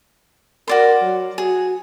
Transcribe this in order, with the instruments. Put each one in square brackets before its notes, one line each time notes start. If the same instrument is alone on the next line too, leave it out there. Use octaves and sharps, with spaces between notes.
[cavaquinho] F#4 D5 C6 [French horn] A#4
[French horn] F#3
[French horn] F#4 [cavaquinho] G#4